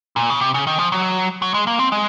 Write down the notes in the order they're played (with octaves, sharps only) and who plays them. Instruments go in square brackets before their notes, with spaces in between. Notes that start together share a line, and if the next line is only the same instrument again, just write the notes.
[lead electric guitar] A#2
C#3
C3
C#3
D#3
F3
F#3
F#3
G#3
A#3
C4
G#3